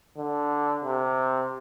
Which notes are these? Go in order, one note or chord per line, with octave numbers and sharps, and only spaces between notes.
D3
C3